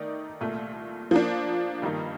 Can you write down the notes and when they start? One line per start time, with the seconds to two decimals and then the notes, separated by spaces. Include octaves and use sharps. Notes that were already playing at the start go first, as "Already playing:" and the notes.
Already playing: D#3 A3 D#4 A#4 D5
0.41 C2 A#2 A3
1.11 F3 A#3 D4
1.82 G2 D#3 G3 A#3 D#4